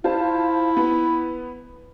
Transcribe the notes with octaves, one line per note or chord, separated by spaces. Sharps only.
E4 F4 C5 A5
B3